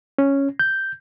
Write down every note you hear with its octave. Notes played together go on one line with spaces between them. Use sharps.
C#4
G6